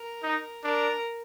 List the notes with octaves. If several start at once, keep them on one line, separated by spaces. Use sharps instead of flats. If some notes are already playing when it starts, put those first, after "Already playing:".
Already playing: A#4
D#4
D4 A#4